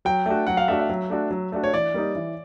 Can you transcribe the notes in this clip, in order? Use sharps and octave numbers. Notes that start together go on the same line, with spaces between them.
F#3 G5
A3 D4 F#4
F#3 F#5
F5
A3 D4 F#4 E5
E5
F#3
A3 D4 F#4
F#3
A3 D4 F#4
C#5
E3 D5
G3 A#3 D#4
E3